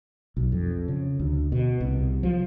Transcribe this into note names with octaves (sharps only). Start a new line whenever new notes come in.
B1
F2
C#3
D2
B2
C2
F3